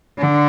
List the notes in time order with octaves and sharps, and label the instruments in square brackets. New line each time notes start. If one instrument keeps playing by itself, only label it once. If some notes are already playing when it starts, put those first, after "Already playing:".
[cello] D3